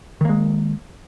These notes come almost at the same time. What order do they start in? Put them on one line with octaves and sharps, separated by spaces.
D#3 A#3 G#3